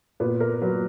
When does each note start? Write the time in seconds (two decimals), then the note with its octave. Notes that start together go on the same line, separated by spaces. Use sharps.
0.20 A#2 B3
0.40 A#4
0.62 F#3 B4